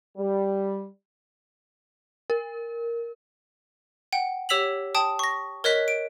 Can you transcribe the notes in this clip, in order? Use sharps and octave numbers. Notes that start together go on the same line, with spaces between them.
G3
A#4
F#5 G5
G4 C#5 E6 B6 F7 F#7
G5 A5 D#6
C#6 A#6
A#4 C#5 D#5 F#6 B6
D7